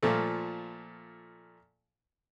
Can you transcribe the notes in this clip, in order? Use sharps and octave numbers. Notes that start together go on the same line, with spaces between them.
A#2 F3 A3